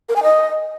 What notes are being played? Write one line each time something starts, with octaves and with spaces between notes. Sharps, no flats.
A#4
G#5
D#5